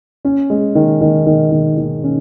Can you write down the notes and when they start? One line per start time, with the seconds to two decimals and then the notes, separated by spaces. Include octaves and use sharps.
0.25 C#4
0.50 G#3
0.75 D#3
1.01 D#3
1.26 D#3
1.52 D#3
1.77 D#3
2.04 C#4